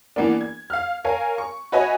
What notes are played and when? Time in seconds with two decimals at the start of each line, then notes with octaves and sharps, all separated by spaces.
0.16 E3 A#3 B3 D4
0.41 G#6
0.70 F5 F6
1.04 A#4 C#5 F5 G#5
1.38 C#6
1.72 F#4 B4 C#5 D#5 E5 G#5